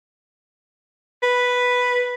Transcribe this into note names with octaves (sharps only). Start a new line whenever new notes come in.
B4